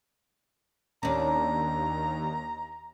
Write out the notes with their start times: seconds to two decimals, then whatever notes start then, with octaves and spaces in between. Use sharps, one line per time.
1.03 D#2 C#4 D4 A#5